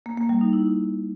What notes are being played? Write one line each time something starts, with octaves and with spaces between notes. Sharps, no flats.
A#3
A#3
G3
D#4
E4